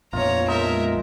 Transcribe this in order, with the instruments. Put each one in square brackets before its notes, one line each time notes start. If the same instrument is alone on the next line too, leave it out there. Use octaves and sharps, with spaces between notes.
[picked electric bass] A#1 F2 B2 [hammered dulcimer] F4 [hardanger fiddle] C#5 A#5
[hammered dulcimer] G#3 D#4 [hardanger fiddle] A#4 E5